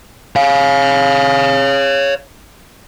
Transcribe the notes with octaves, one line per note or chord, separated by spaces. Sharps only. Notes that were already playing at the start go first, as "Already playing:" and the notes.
C#5 F5